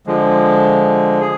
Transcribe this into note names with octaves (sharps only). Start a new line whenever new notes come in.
D3 F3 G#3
G#4